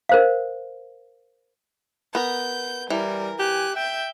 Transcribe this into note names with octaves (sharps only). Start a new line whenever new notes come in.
A#4 C5 F5
B3 A#4 G6
E3 G3 A#4
G4 G#5 F#6
E5 G5 G6